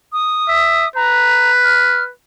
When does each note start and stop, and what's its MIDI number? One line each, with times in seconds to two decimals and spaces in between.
0.13 0.88 87
0.48 0.86 76
0.96 2.12 71
0.96 1.51 82
1.64 2.03 89